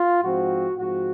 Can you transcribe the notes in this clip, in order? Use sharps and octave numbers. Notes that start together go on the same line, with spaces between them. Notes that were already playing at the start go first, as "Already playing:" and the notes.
Already playing: F4
G#2 F3 C4 F#4
G#2 F3 C4 F#4